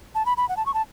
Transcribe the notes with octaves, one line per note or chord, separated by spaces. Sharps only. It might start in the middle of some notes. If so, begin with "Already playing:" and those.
A5
B5
B5
F#5
A5
C#6
A5